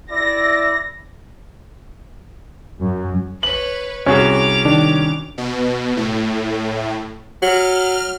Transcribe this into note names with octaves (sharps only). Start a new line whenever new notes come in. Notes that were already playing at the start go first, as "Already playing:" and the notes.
E4 D5 A#6
F#2
B4 C#5 F#7
C2 C#4 F#4 G#4 D6 F7
D#3 D4
B2
A2
F#3 F6